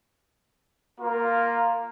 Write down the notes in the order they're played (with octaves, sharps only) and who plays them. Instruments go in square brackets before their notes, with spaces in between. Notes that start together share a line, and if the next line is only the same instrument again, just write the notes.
[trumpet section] A#3 F4 A#4